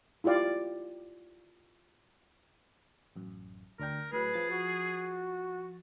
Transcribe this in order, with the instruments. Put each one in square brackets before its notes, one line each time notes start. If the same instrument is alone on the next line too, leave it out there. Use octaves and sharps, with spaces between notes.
[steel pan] E4 F4 G4 D5 F5
[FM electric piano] A1 F#2
[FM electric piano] D2 D4 G5 [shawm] A#4
[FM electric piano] A2 F#3 [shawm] G#4 [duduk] B4
[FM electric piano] F3 A6
[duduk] F#4